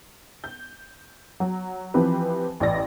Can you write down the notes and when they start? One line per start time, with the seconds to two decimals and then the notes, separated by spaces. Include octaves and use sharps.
0.44 G6
1.40 F#3
1.94 E3 F3 C4 G4 B4
2.60 A1 D5 A#6